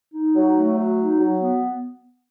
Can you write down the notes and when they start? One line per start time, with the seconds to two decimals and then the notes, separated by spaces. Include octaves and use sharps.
0.14 D#4
0.36 F#3
0.57 A3
0.77 F#3
0.99 D#4
1.19 F#3
1.40 B3